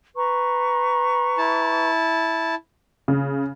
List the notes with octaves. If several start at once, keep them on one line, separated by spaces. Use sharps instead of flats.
B4 A#5 C#6
E4 A5
C#3